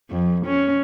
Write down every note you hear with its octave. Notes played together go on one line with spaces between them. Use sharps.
F2
C#4